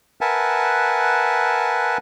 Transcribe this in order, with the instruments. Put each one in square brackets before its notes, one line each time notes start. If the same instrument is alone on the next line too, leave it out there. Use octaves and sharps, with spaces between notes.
[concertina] A#4 B4 E5 F#5 G#5 A5